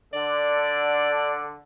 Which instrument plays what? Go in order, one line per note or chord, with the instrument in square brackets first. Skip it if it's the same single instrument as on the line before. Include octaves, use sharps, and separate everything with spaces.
[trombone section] D3 [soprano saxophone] D5